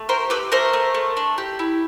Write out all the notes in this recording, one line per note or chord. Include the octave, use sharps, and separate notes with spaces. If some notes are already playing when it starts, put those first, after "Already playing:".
Already playing: A3
G4 A#4 C5
G4 A4 B4
A3 A#4 C5
A3
A3
D4
G4
E4